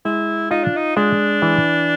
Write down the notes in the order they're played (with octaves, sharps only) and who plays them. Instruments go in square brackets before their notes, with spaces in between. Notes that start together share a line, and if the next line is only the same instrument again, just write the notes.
[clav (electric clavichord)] G#3 [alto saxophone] E4
[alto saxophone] D#4 [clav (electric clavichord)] F4
[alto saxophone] D4
D#4
[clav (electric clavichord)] G#3 [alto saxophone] D4
[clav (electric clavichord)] E3